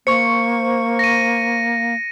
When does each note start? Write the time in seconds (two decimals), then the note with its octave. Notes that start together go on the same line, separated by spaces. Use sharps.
0.07 A#3 C5 C#6 C#7
0.99 A#6 D#7